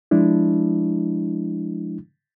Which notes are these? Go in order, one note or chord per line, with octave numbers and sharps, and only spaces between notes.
F3 G#3 D4 E4